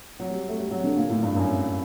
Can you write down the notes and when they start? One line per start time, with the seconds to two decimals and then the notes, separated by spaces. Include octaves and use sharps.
0.19 F#3
0.30 G3
0.48 A3
0.59 G3
0.71 F#3
0.84 D3
0.97 A#2
1.10 A2
1.23 G2
1.36 F#2